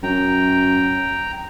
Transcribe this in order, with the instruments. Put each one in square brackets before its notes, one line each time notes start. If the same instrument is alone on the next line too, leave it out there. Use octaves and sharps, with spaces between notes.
[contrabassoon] F#2 [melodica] G5 A#5